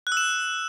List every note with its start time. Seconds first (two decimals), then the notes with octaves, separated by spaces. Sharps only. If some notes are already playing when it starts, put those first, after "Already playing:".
0.07 F#6
0.12 E6
0.17 E7